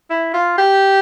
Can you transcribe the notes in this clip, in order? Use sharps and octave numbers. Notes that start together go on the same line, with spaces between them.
E4
F4
G4